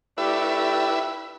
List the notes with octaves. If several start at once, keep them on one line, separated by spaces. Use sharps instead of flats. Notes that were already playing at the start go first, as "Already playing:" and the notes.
A3 D4 E4 G4 B4 E5